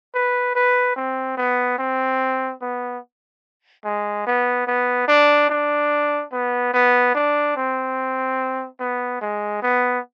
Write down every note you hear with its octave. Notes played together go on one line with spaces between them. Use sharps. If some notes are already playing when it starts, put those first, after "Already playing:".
B4
B4
C4
B3
C4
B3
G#3
B3
B3
D4
D4
B3
B3
D4
C4
B3
G#3
B3